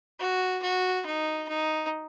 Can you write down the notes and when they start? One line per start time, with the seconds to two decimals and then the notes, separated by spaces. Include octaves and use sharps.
0.20 F#4
0.63 F#4
1.06 D#4
1.48 D#4